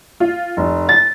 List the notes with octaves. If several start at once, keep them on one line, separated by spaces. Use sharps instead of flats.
F4
F1
A6